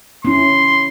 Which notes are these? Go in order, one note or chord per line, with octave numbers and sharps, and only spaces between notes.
C#4 E4 C6